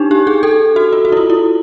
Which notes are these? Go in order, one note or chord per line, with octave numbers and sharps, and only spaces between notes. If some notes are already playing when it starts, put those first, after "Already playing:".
Already playing: D4 D#4 G4
G4
G#4
A4
F#4
F4
F#4
E4
F4
E4